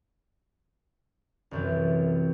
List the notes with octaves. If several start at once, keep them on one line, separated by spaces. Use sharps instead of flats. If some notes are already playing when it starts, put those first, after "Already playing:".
C2 F#2 E3